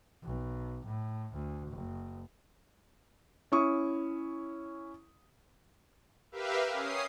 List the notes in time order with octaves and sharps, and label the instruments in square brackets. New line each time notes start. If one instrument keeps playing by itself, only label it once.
[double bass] B1
A2
D2
F#1
[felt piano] C#4 E4 C#6 D#6
[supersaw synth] G4 A#4 B4 E5 F5
C#4 D#6 C7